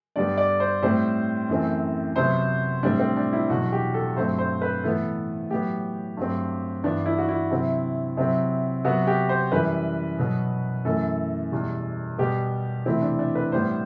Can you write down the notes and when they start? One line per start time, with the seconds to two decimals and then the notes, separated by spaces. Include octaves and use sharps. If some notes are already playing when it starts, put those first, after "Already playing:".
0.16 G2 D3 G3 B3 D5
0.38 D5
0.60 C5
0.82 A2 G3 C4 C5
1.49 F#2 E3 A3 C4
2.16 C3 F#3 B3 C5
2.83 A2 G3 C4 D4
2.99 C4
3.17 D4
3.33 E4
3.50 E2 B2 F#3 F#4
3.72 G4
3.94 A4
4.16 G2 F#3 A3 C4 C5
4.39 C5
4.62 B4
4.83 A2 E3 B3 A4
5.50 A2 F#3 B3 G4
6.17 G2 F#3 A3 C4
6.84 G2 E3 B3 D4
7.06 E4
7.18 F#4
7.29 E4
7.51 C3 F#3 C4
8.17 C3 F#3 C4
8.85 C3 F#3 B3 F#4
9.07 G4
9.29 C5
9.51 F#2 E3 G3 B4
10.19 B2 F#3 B3
10.85 F#2 E3 A3 A4
11.52 E2 B2 G3
12.18 B2 G3 B3 G4
12.85 E2 C3 E3 A3 C4 E4
13.02 D4
13.19 D4
13.35 B4
13.52 A2 G3 B3 C5